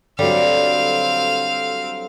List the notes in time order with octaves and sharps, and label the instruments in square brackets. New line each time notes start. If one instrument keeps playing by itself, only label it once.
[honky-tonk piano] D3 F#3 [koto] G3 [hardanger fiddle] C4 F5